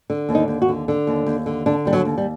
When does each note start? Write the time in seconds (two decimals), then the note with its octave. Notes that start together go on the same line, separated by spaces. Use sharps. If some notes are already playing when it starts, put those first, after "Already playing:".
0.10 D3
0.29 D#2
0.35 D#4
0.48 D#2
0.62 F#4
0.68 D3
0.88 D3
1.07 D#2
1.27 D#2
1.46 D3
1.66 D3 D4
1.85 D#2 G3
1.93 F#3
2.05 D#2
2.18 G3